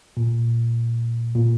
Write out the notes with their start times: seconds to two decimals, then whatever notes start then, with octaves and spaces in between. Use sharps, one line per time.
0.17 A#2
1.36 A#2